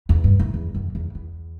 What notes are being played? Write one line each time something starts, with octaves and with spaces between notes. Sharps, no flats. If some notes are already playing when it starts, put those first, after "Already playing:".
E2
G2
F#2
E2
F#2
E2
E2